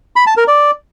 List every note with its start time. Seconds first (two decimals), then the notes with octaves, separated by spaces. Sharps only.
0.16 B5
0.27 A5
0.37 A#4
0.48 D5